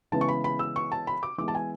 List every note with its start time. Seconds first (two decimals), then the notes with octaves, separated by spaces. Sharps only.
0.12 C#3 E3 G#3 B3 A5
0.21 C#6
0.28 B5
0.44 B5
0.59 E6
0.76 C#6
0.92 A5
1.07 B5
1.23 D6
1.38 E3 G#3 B3 D6
1.48 A5
1.55 G#5